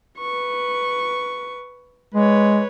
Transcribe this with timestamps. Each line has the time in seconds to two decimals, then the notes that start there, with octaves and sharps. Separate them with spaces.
0.18 B4 C#6
2.14 G#3 B4 C#5